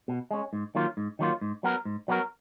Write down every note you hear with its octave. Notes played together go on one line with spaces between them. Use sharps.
B2
G#3 C#4
G#2
D#3 F#3 A#3 F4
G#2
D#3 F#3 A#3 F4
G#2
F#3 B3 F#4 A#4
G#2
F#3 B3 F#4 A#4